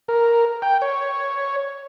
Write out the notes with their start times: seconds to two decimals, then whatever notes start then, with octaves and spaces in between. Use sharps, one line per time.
0.08 A#4
0.62 G5
0.82 C#5